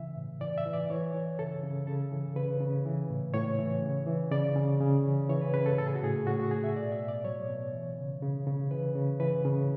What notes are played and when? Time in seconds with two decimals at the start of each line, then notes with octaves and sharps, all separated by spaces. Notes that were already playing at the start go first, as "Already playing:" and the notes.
Already playing: C#3 E3 E5
0.16 A2
0.41 E3 D5
0.58 E5
0.65 E3
0.73 D5
0.90 E3 C#5
1.14 E3
1.39 C#3 A4
1.63 C#3
1.87 C#3 A4
2.12 E3
2.36 C#3 B4
2.61 C#3
2.85 E3
3.10 A2
3.34 A2 C#5
3.59 E3
3.83 C#3
4.07 E3
4.31 C#3 D5
4.56 C#3
4.80 C#3
5.05 E3
5.29 E3 C#5
5.41 B4
5.54 C#3 B4
5.66 A4
5.78 A2 A4
5.87 G#4
5.95 F#4
6.03 A2 G#4
6.27 A2 F#4
6.39 F#4
6.51 A2 G#4
6.64 E5
6.76 B2 D5
6.92 E5
7.00 B2
7.08 D5
7.25 F#3 C#5
7.49 B2
7.73 E3
7.98 C#3
8.22 C#3
8.47 C#3
8.71 E3 B4
8.95 C#3
9.20 E3 B4
9.45 C#3